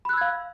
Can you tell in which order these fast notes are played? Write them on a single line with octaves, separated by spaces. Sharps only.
B5 F#6 E6 G#6 F5